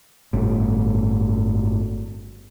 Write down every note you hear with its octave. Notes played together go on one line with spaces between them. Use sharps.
G1 A2